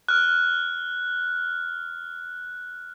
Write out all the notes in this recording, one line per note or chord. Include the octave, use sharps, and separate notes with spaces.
F6 F#6